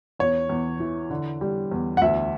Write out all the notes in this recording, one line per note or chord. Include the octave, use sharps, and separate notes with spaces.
E2 C#5
E2
E3
D3
G3
E2
F#5
D2 E5